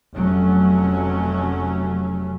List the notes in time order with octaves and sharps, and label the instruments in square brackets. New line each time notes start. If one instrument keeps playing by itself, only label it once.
[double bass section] F1 F#3 A3 C#4